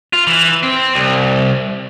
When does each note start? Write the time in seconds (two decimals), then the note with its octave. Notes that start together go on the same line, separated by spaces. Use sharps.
0.13 F4
0.27 E3
0.63 C4
0.95 C2